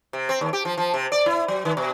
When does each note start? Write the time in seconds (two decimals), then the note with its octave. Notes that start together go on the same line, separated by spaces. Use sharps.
0.13 C3
0.29 C4
0.41 D#2
0.53 G4
0.65 F3
0.78 F3
0.94 C3
1.12 D5
1.26 E4
1.48 F#3
1.65 D#3
1.77 B2